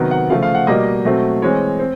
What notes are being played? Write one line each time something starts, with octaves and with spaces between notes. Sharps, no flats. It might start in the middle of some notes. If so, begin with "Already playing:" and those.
Already playing: C3 D#3 F#3 B3
F#5
C#3 F3 A3 F5
F5
F#5
B2 G3 A#3 D#5
B2 F#3 A3 C4
E3 G#3 C4 C#5
C4